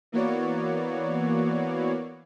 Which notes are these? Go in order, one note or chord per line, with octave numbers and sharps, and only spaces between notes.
E3 A#3 B3 F#4 C#5 D5